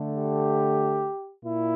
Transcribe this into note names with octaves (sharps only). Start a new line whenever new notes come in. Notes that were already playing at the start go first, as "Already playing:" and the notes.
Already playing: D3 A3
G4
A#2 E4